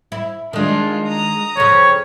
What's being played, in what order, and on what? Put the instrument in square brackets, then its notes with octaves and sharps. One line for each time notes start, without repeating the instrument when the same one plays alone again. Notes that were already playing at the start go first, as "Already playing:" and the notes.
[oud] E4
[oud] D#3 G#3 [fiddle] D4 F4
[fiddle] A#5 D#6
[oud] F2 C#3 [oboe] C#5